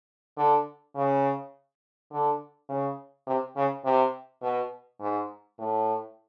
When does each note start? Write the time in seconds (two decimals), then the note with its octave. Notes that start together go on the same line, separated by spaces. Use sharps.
0.37 D3
0.96 C#3
2.12 D3
2.69 C#3
3.27 C3
3.56 C#3
3.85 C3
4.42 B2
5.01 G#2
5.59 A2